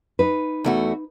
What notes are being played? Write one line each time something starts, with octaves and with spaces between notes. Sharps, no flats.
D#4 B4
E2 A3 F#4